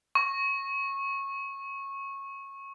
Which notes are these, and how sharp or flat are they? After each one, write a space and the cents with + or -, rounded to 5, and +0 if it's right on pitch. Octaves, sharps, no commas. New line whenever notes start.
C#6 -20